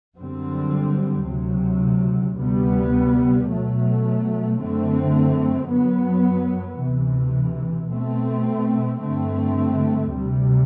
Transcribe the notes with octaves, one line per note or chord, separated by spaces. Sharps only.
F#2 D3 G3 C4
D2 C3 F#3
D2 C3 G3 B3
B2 F#3 A3
F#2 D3 A3 C4
F#2 F#3 B3
D2 C3 E3
B2 A3 C4
G2 D3 A3 C4
D2 C3 G3